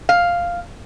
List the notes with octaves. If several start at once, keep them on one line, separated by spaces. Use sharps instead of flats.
F5